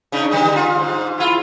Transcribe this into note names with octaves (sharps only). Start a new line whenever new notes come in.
C#3 D4 D#4
D3 G3 D#4
F4
G#2
E4 F4